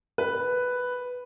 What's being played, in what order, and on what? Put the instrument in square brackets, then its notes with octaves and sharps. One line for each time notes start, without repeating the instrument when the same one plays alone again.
[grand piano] B4